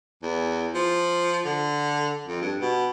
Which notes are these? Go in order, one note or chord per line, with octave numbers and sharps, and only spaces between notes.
E2
F3
D3
F2
G2
B2